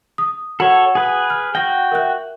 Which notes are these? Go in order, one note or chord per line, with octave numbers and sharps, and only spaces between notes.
D#6
F#4 A4 C#5 F#5 F#7
G#4 B4
F6
F#4 G5 G6 A#6
A#4 E5 F#6